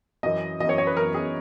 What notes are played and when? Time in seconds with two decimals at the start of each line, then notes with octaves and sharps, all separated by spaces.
0.23 F#2 E3 D#5
0.60 E3 D#5
0.65 F#2 C#5
0.78 C#5
0.87 B4
0.96 F#2 E3 A#4
1.14 G#4